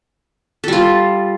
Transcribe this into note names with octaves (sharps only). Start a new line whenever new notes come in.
G3 F4 A4